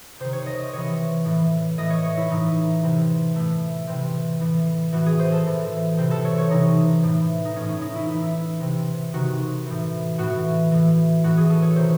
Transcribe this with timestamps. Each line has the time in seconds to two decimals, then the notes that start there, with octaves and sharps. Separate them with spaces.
0.19 C3 D#3 C5
0.33 C#5
0.46 D#5
0.60 D#5
0.73 C3 E3 C#5
1.25 A2 E3
1.78 A2 E3 D#5
1.90 C#5
2.04 C#5
2.17 E4
2.30 A2 E3 D#4
2.83 C3 E3
3.35 A2 E3 A3
3.87 C3 E3 C4
4.40 A2 E3
4.92 A2 E3 F#4
5.06 G#4
5.19 C5
5.32 A4
5.46 A2 E3
5.98 C3 E3 C5
6.11 A4
6.25 C#5
6.38 C#5
6.50 C3 E3 D#4
7.03 A2 E3
7.45 D#4
7.56 A2 E3 C#4
7.69 C#4
7.81 D#4
7.95 E4
8.08 A2 E3 E4
8.60 C3 E3
9.13 C3 D#3 F#4
9.66 A2 E3
10.18 A2 E3 F#4
10.71 A2 E3
11.24 A2 E3 F#4
11.37 G#4
11.49 A4
11.62 C#5
11.76 C3 D#3 C5